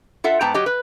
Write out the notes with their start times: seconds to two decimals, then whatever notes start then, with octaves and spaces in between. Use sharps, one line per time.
0.24 F4 A4 E5 F#5
0.41 G#2 B3 G5 A5 A#5
0.54 F#3 G4 D#5
0.66 B4